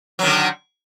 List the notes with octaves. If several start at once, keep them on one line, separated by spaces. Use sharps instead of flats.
D3 D#3 F#3